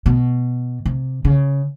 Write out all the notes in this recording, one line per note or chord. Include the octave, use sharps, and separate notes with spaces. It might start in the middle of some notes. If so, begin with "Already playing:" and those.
B2
C3
C#3